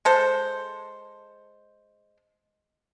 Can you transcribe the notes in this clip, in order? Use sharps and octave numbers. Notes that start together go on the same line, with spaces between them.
G#3 A4 C5